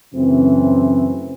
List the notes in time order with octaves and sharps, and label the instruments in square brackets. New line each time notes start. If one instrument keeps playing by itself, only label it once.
[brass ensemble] F#2 C#3 E3 A3 C4